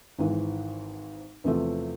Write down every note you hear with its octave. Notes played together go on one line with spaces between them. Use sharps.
G#1 G#2 E3
E2 C3 F3 A3 C4